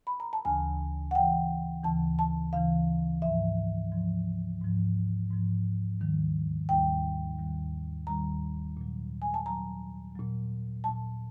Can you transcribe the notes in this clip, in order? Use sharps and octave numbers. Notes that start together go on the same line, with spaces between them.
B5
A#5
A5
D2 C#3 E3 G#5
F#5
D2 C#3 E3 G5
D2 C#3 E3 A5
A5
D2 C#3 E3 F5
G#2 F3 E5
G#2 F3
G#2 F3
G#2 F3
D#2 D#3 G3
D#2 D#3 G3 G5
D#2 D#3 G3
D#2 D#3 G3 A#5
A#2 F#3
G#5
A5
A#2 F#3 A#5
A#2 F#3
A#2 F#3 A5